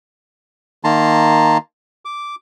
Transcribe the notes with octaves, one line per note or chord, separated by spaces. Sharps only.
D#3 A#3 A5 A#5 C6
D6